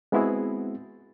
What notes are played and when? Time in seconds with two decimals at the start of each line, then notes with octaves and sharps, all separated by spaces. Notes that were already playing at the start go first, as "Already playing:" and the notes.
0.12 G#3 B3 C4 E4 F#4 G#4